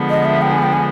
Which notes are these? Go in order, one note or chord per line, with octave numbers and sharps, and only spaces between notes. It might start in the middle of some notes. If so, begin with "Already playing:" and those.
Already playing: D3 F3 G#3 B3
D#5
E5
G5
G#5
G5
G#5